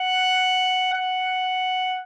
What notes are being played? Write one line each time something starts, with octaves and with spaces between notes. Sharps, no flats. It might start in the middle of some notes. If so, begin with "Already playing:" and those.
Already playing: F#5
F#5